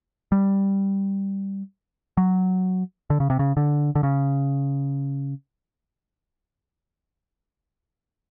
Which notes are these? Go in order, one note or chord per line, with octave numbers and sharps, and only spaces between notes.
G3
F#3
D3
C#3
C3
C#3
D3
D3
C#3